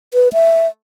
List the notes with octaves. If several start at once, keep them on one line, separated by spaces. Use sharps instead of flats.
B4
E5